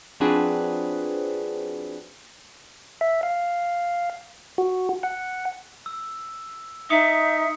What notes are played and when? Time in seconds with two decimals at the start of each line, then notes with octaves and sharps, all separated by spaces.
0.20 F3 C4 D4 F#4 G#4 B4
3.01 E5
3.23 F5
4.58 F#4
5.03 F#5
5.86 E6
6.90 D#4 E5 D#6 C#7